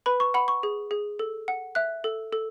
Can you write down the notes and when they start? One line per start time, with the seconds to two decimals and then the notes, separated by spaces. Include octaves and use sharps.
0.06 B4 B5
0.20 C#6
0.34 F#5 B5
0.48 C#6
0.63 G#4
0.91 G#4
1.19 A4
1.48 F#5
1.75 E5 F#6
2.04 A4
2.33 A4